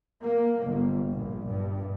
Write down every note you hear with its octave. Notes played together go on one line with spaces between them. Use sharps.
A#3
G1
A#1
G2